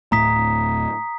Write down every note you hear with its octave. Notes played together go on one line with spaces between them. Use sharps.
D1 A2 A3 A#5 D#6 B6